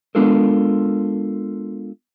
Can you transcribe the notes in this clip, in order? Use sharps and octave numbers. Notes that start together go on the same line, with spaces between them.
G#3 B3 D4 F4 A4 A#4